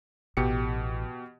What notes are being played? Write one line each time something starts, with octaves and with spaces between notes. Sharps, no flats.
A1 B2 G4 C#7